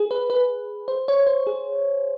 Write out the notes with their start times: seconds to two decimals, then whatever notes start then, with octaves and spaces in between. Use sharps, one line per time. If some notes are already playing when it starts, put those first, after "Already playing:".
Already playing: G#4
0.11 B4
0.30 B4
0.88 C5
1.08 C#5
1.27 C5
1.47 G#4